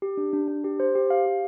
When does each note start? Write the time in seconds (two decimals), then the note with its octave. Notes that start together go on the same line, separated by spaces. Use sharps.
0.02 G4
0.17 D4
0.33 D4
0.48 D4
0.64 G4
0.80 C5
0.95 G4
1.10 F5
1.26 G4